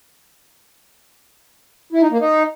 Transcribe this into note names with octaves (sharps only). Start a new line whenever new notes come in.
E4
D#4
A#3
D#4